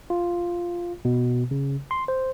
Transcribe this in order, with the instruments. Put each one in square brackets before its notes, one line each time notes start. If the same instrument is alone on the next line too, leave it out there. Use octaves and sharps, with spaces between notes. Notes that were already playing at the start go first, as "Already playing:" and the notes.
[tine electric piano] F4
B2
C#3
C6
C5